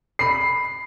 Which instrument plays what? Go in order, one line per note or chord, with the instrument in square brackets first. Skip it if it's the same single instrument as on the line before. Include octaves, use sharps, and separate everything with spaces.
[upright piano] B5 C7